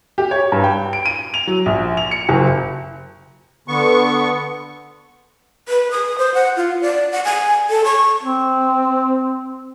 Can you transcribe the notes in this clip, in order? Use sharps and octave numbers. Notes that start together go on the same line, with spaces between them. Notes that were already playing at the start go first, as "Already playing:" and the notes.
G4
C#5
G2
G5
D7
D#7
F7
F#3
A#1
F7
C#7
F#1
D3 B3 C#6
B4
D#6
C5
F#5
F4
D5
F#5
G#5
A4
C#6
C4